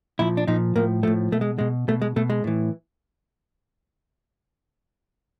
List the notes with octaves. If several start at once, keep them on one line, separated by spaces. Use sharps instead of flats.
A#2 F3 E4
D4
A#2 F3 D#4
A2 F3 A#3
A2 F3 A3
B2 A3
G#3
B2 G#3
B2 A3
G#3
B2 A3
G#3
A2 E3